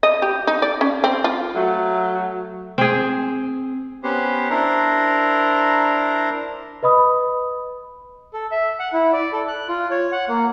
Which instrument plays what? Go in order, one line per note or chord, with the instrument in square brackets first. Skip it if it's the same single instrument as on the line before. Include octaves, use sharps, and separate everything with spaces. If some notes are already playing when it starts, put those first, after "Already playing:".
[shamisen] D#5
G4
D#4
D5
C#4
C4
F4
[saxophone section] F#3 A3
[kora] C4 G#4
[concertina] B3 C#4 G4 C5
D4 E4 A#4 C5 A#5
[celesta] B4 D#5 B5 D#6
[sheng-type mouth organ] A4
E5
F#5
E4
D5
A4
F#6
F4
C#5
F#5
A#3